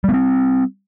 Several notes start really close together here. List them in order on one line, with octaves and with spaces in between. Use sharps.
G3 B3 C4